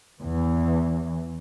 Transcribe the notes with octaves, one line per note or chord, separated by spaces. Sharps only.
E2 E3